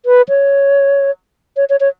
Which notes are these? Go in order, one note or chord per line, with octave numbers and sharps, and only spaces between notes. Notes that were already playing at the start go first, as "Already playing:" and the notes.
B4
C#5
C#5
C#5
C#5